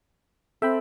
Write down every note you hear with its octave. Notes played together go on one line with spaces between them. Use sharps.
C4 A4 E5 G5 B5